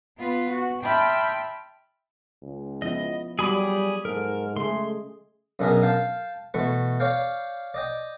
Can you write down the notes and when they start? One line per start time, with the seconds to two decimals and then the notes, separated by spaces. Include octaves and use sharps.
0.16 B3 F4 B4
0.49 F#4
0.81 E5 G5 A5 B5 C6 F6
2.42 C#2
2.82 F3 B3 E4 D#5
3.39 F#3 G3 F#4 G#4 B5 D6
4.05 G#2 A4 A#4
4.56 C#3 G#3 A3 G#4 C6
5.59 F#2 B2 D4 G#4 A#4 E5
5.83 F5 G5 A5
6.54 B2 E3 A3 C#6
7.00 C#5 D5 F5 G5
7.74 D5 D#5 G5